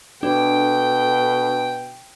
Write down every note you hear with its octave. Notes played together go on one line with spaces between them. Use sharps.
B2 D4 A4 G5